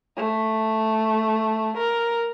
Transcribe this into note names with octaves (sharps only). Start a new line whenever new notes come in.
A3
A#4